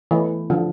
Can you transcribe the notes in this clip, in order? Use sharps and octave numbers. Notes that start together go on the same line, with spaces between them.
E3 A3
D3 F3